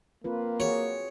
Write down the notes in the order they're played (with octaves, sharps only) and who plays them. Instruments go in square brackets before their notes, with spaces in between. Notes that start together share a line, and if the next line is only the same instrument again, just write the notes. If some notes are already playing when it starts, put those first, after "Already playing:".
[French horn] A#3 [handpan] C4 F4 B4
[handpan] F#4 G#4 [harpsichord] C#5